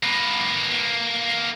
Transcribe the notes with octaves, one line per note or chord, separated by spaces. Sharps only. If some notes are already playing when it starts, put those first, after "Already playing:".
A#3 B4